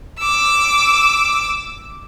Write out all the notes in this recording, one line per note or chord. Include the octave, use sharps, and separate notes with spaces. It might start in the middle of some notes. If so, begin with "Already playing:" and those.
D6 E6